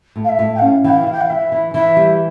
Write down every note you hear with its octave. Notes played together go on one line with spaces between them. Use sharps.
A2
F5
E5
A2
G5
C#4 F5
E3 F5 G5
E3
G5
F5
E3 E5
E3
E3 E5
G3